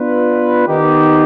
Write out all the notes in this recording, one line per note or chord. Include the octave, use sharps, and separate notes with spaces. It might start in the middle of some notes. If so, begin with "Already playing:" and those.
Already playing: B3 D4 F4 B4
D#3 B3 D#4 G4